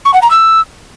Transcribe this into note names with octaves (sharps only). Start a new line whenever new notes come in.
C#6
F#5
A#5
E6